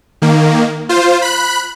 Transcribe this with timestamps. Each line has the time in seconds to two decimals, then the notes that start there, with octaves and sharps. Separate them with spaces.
0.22 D#3 A#3
0.89 F4 C5
1.22 B5 F#6